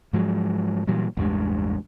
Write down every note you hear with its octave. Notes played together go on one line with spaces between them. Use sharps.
G#2 F3 F#3 G#3
A#2 E3 F#3 G3
A1 E2 G2 G#3